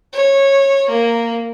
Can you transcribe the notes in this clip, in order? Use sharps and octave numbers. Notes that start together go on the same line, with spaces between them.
C#5
A#3